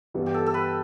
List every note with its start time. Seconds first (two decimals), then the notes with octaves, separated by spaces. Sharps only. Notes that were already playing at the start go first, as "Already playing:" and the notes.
0.14 G2 E3 G3 B3
0.26 G4
0.34 A4
0.46 A4
0.54 B4